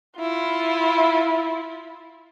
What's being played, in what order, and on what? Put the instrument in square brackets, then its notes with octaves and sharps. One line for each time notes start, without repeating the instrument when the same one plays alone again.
[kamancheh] E4 F4